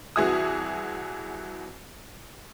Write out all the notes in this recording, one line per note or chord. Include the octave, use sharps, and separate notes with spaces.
C2 E3 F#4 G#4 E5 D#6